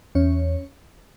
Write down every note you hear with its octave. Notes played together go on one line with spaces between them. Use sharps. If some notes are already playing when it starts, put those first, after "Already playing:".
E2 C#4 C#5